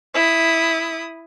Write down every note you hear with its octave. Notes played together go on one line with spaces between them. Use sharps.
E4 D#6